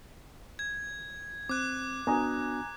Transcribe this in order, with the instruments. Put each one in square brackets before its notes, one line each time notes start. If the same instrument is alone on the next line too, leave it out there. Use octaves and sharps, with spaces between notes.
[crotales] G#6
[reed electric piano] C4 [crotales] D6 F#6
[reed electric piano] B3 D4 F#4 [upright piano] G#5 A#5 D#6